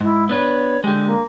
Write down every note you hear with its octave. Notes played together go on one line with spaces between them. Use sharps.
G#2 E4
B3 D4 B4 C#5
D3 G#3 G4
A#3